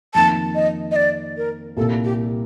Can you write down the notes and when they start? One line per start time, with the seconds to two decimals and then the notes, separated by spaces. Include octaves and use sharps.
0.14 F2 D#3 A#3 A5
0.55 D#5
0.91 D#5
0.96 D5
1.37 A#4
1.77 C2 A#2 G3 A#3 A4
2.04 G4